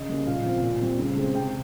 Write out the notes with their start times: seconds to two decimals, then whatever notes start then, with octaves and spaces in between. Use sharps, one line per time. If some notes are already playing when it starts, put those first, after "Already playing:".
Already playing: C#3 D#5
0.09 G3 A#3 C#4
0.27 A#2 F5
0.45 F3 C4
0.63 A#2
0.81 G3 C4
0.99 C#3
1.17 G#3 C4
1.35 C3 G5